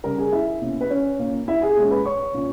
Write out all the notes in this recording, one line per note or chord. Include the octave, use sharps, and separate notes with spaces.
C#3 G3 C#4 A#4 A#5
G#4 G#5
E4 E5
B2 A#3 C#4
B4
C#4 C#5
A#2 A#3 C#4
E4 E5
G#4 G#5
A#2 G#3 C#4
B4 B5
C#5 C#6
A#2 A#3 C#4